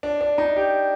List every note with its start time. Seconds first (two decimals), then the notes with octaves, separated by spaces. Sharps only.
0.03 D4
0.21 D4
0.38 D#4
0.56 G4